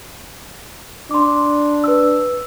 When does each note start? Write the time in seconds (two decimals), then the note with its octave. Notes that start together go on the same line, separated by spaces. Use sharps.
1.11 D4 C6 D6
1.84 B4 E6